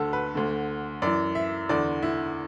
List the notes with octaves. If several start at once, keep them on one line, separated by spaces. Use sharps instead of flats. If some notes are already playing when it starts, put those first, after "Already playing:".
Already playing: D2 D3 F#4 A4
B4
D2 D3
F#2 E3 D5
E5
E2 D3 D5
E4